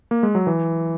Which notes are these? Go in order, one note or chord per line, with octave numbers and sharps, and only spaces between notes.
A#3
G#3
F#3
E3